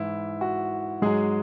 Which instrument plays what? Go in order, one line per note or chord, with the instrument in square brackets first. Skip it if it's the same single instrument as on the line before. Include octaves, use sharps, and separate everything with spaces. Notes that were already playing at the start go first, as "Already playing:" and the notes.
Already playing: [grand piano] G#2 E3 E4
F#4
G#2 F#3 G#3 G#4